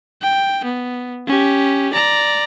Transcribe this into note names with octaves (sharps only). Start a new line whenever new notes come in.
G5
B3
C#4 G4
D5 A#5